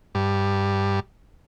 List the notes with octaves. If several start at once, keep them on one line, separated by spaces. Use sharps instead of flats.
G2